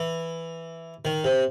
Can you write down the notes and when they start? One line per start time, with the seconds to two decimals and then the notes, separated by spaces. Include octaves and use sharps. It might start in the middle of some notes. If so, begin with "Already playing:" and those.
Already playing: E3
1.05 D#3
1.24 C3